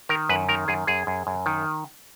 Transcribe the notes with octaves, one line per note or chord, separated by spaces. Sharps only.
D#3 A#4
F#2 B4
D#3 A#4
F#2 G#4
F#2 G#4
F#2
F#2
D#3